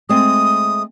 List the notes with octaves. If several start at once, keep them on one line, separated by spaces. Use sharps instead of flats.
G#3 A3 C4 D#6